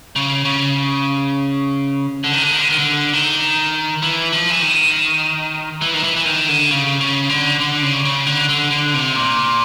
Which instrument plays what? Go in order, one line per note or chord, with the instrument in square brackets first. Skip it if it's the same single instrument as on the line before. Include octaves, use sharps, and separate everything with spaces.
[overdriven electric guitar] C#3
C#3
D3
D#3
D3
D#3
D3
D#3
D3
D#3
E3
F3
E3
D#3
E3
D#3
E3
E3
D#3
D3
C#3
C#3
D3
D3
C#3
C#3
D3
D3
D3
C3
A#2